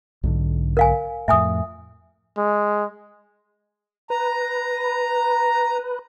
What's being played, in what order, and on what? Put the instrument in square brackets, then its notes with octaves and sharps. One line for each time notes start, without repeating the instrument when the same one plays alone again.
[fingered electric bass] B1 G#2 D3
[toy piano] A#4 F5 G#5
[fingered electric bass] F2 A2 [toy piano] E5 G#5 D#6
[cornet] G#3
[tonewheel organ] B4 [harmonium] A#5